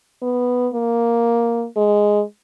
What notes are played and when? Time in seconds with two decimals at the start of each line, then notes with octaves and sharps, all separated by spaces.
0.22 B3
0.74 A#3
1.77 G#3